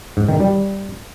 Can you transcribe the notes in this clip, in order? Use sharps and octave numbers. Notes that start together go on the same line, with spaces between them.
G#2
D#3
G3